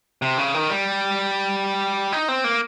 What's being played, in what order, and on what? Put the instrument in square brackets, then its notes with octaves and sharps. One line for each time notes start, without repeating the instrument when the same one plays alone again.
[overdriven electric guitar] C3
C#3
D#3
G3
D#4
C4
A#3